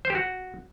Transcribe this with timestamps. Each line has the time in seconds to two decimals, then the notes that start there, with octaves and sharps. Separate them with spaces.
0.05 C5
0.10 G4
0.15 F#4